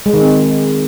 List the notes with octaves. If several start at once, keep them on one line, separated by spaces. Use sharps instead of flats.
G#3
D#3
C4